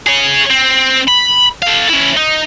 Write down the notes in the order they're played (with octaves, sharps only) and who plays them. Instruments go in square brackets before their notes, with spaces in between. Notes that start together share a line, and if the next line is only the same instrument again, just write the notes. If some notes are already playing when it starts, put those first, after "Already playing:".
[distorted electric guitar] G#4 C#5
C4
B5
A4 F5
C#4 E4
D#4